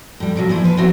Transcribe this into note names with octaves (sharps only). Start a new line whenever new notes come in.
A2 G3
C3 F3 F#3
A#2 E3 F3 E4
F3 B4
F3 A3 B3 C4 E4 F#4